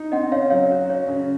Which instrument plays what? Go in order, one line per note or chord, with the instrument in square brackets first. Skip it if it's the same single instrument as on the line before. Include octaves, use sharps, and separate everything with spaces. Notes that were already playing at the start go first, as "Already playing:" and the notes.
Already playing: [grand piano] D#4
[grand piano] C4 [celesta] D#5 F#5
[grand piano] C#3 [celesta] C#5 F5
[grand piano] F#3 [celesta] C#5 F5
[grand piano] F#4
[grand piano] C#4 [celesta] C#5
[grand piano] C#3